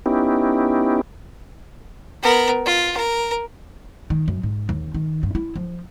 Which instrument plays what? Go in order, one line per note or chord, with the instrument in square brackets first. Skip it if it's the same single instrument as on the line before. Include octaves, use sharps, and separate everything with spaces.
[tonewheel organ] B3 C#4 D#4 E4 G4
[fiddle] B3 A#4
F4
A#4
[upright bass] D#3
F#2
G#2
D#2
D#3
G2
E4
F3